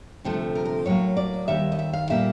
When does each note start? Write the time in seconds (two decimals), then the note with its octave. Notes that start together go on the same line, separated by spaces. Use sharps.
0.25 D2 C3 F3 A3
0.55 A#4
0.65 A#4
0.86 A2 F#3 A#3 C#5
1.17 D5
1.48 D#2 D#3 G3 E5
1.72 D#5
1.79 E5
1.93 F5
2.10 A#2 G3 A#3 E5